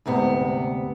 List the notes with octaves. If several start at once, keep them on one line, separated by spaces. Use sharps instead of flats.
D2 G#2 C3 B3